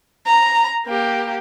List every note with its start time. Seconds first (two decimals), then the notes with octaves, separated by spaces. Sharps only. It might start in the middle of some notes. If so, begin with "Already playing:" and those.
0.26 A#5
0.86 A#3 G4